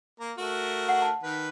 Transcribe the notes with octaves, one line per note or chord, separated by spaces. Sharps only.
A#3 A#5
A3 F#4 A#4
F#5
A5
D#3 B4